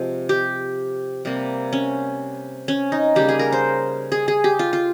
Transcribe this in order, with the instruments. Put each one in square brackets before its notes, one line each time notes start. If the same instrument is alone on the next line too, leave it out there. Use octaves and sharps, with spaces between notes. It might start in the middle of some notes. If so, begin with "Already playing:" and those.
Already playing: [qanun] C3 F3 G#3
G4
C3 G3 A#3
C#4
C#4
D#4
C#3 G3 A#3 G4
G#4
A#4
C5
G#4
G#4
G4
F4
F4